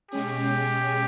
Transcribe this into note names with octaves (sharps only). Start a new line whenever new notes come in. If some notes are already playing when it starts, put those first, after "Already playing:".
B2 G#3 C#4 G4 G#4